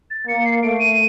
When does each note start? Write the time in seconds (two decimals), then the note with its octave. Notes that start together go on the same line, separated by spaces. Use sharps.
0.11 A6
0.27 A#3 C#7
0.45 C7
0.63 A3 D7
0.80 D#7